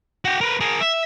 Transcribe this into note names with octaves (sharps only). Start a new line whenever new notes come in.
F#4 G5
A#4 B4
G#4 A#4
E5